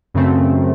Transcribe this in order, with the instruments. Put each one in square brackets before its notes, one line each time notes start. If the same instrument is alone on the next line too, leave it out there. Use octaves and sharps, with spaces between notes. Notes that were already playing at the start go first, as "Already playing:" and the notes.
[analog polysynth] F#2 C#3 A3 C4